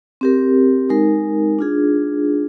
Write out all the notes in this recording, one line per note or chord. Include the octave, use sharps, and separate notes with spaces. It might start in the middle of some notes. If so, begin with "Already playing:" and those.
C4 G4 A#4
G#3 D#4 A#4
D4 F4 G#4